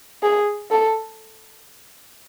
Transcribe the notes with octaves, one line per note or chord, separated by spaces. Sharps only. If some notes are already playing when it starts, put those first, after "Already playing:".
G#4
A4